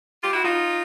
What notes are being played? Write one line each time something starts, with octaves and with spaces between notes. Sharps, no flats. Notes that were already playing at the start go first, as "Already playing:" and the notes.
F4 G4
E4 F#4
D#4 F4